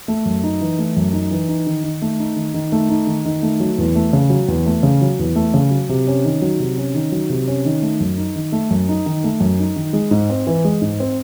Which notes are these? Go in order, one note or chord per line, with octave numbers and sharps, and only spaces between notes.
A3
F#2
D#4
E3
A3
F#2
D#4
E3
D#4
D#3
D#3
A3
D#4
D#3
D#3
A3
D#4
D#3
D#3
A3
F#3
E2
A3
C#3
F#3
E2
A3
C#3
F#3
E2
A3
C#3
F#3
C3
C#4
D#3
F#3
C3
C#4
D#3
F#3
C3
C#4
D#3
A3
F#2
D#4
D#3
A3
F#2
D#4
D#3
A3
F#2
D#4
D#3
G#3
G#2
C4
E3
G#3
G#2
C4